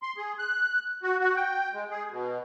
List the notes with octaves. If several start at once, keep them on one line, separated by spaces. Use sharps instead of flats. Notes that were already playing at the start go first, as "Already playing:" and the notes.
C6
G#4
F#6
F#4
F#4
G5
G#3
G#4
B2